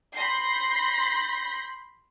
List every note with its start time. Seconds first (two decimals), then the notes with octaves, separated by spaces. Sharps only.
0.13 B5 C6 G6 A#6 C7